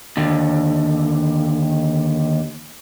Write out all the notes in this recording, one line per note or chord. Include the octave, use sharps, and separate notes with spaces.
D#2 D3